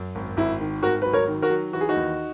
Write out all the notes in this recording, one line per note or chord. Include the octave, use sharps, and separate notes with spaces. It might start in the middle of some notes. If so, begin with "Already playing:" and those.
Already playing: F#2
G#1
G#1 E4
D#3
G#1 F#4 A#4
F#3 B4
A#4 C#5
D#3
F#4 A#4
F#3
E3 F#4
G#4
D#4 F#4
D#2